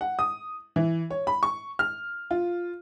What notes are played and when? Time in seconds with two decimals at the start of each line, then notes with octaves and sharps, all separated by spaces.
0.01 F#5
0.19 D#6
0.76 E3
1.11 C#5
1.27 B5
1.43 C#6
1.79 F6
2.31 F4